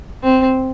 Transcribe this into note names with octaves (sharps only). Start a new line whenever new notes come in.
C4